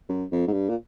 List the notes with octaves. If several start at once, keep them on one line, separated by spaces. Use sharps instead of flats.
F#2
F2
G#2
G2
A#2